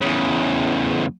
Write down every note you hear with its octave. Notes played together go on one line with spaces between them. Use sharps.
E2 C#3